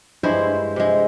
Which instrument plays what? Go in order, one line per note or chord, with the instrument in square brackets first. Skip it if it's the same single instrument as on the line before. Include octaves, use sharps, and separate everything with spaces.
[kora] G2 G#3 E4 C5
C3 G#3